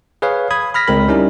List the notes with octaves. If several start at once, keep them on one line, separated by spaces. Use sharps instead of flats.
G#4 B4 C#5 F5
B5 D#6 G#6
B5 F6 A#6 B6
C#2 G#3 C4 A#4 B5
G3 C#4 D#4 E4 A#4